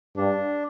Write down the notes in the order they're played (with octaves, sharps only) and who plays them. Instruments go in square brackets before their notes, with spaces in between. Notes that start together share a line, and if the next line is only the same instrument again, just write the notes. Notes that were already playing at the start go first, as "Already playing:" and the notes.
[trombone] G2 [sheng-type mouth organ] D4